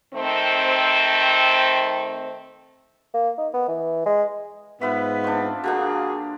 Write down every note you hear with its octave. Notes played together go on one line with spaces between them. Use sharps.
D#3 A3 C4
A#3
D#4
B3
E3
G#3
G#2 B3 F4 B4 E5
C4 D4
D3 A#3 D4 F#4 G#4